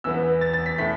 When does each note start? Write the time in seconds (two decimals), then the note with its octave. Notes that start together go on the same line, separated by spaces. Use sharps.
0.04 E2 E3 B3 E6
0.41 A6
0.53 A6
0.66 B6
0.78 A2 A3 B6